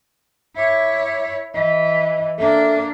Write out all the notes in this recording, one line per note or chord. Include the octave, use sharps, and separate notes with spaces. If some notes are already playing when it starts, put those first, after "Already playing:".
E4 C#5 E5 D6
E3 D#5
A#3 D4 A4 E5